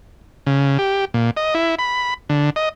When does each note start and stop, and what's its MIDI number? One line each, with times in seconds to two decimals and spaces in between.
0.46 0.78 49
0.78 1.05 67
1.14 1.31 46
1.37 1.54 75
1.54 1.75 64
1.79 2.14 83
2.29 2.50 50
2.56 2.69 75